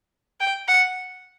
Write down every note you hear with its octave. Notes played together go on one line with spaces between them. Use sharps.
G5
F#5